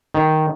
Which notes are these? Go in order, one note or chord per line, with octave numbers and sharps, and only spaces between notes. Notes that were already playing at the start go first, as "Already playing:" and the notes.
D#3